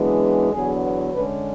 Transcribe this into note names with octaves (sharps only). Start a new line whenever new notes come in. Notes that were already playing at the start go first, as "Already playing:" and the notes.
Already playing: F#2 E3 G#3 B3 D4
E2 D3 F#3 B3 G#4
D3 G#3 C#4 B4